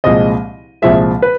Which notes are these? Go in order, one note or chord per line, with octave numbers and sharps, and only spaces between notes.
C2 A#2 F3 G#3 D#5
C2 A#2 F3 G#3 E5
B4